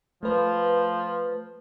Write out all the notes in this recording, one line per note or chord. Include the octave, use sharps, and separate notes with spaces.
F3 A3 B4